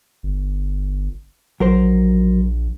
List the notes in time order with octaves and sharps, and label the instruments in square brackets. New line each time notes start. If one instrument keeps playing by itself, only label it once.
[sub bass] G1
[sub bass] A#1 [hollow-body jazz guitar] F#3 A#4 C5